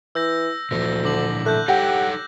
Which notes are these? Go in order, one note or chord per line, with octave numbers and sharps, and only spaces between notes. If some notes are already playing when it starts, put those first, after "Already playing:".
E3 E6 G6 A#6
D2 A#2 E3 F3 A#6
D3 D6 A#6 F#7
A3 F#6 G6
D#4 G4 A4 C#5 F#5 G5 A#6